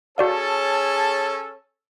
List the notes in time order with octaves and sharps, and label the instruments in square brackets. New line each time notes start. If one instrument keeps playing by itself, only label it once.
[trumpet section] C#4 A4 [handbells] F#4 D5 F5 [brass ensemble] G#4 C#5 A5